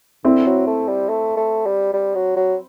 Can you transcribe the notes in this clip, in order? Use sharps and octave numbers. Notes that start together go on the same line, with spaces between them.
D3 C4 E4
F#3
A3
G3
A3
A3
G3
G3
F#3
F#3